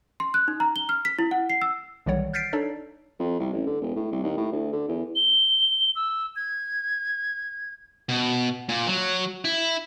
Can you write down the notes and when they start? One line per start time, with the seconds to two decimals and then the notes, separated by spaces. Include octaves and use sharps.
0.20 C6
0.34 F#6
0.48 D#4
0.60 A#5
0.76 G7
0.89 F6
1.05 B6
1.19 E4
1.31 F#5
1.50 C7
1.62 E6
2.06 B1 D#3 E3 G3 C#5 F#5
2.33 F6 G6 A6 B6 C7 D7
2.53 D4 D#4 A4 C#5 D5
3.19 F2
3.40 C2
3.53 A1
3.66 D3
3.82 E1
3.96 A2
4.12 C2
4.23 D#2
4.37 A2
4.52 D2
4.72 D3
4.88 E2
5.15 G7
5.95 E6
6.36 G#6
8.09 B2
8.69 A#2
8.88 F#3
9.45 E4